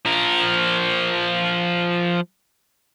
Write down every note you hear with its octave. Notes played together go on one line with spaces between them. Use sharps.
F3 A#4